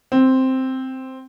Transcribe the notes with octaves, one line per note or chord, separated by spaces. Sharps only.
C4